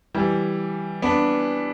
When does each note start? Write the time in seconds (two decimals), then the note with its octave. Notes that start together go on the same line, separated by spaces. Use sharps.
0.15 E3 G3
1.02 B3 D4